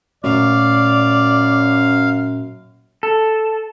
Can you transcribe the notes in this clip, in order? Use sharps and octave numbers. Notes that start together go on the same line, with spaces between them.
F#2 A#2 A3 D5 F5
A4